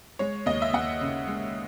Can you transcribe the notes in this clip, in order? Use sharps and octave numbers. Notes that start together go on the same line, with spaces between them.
G#3 C#5
D#2 D#5
E5
D#2 F#5
C#3
G#3